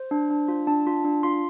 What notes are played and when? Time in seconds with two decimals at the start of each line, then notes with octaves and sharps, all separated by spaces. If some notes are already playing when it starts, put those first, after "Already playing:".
Already playing: C5
0.11 D4
0.30 D4
0.48 F4
0.67 D4 A5
0.87 F4
1.05 D4
1.23 F4 C6